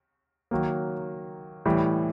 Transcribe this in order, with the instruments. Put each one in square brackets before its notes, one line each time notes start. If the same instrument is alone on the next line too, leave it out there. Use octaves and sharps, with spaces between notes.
[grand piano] D#3 F#3 A#3
A2 E3 G3